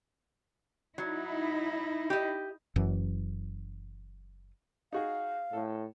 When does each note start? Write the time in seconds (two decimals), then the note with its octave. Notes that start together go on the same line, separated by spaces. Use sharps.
0.98 F#3 D#4 E4
2.10 G4 D#5
2.76 F#1 F#2 E3
4.93 D#4 F#4 G#4 F5
5.53 A2 A4